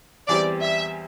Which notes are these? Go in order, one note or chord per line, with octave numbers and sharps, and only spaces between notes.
E2 E3 G3 C4 G4 D5
E5